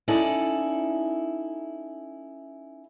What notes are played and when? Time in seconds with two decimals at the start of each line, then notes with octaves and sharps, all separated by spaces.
0.08 C#4 D#4 E4 A4 D5 E5